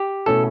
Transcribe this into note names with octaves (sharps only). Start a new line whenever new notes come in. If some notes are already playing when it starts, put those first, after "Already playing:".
Already playing: G4
B2 A3 C#4 E4 A4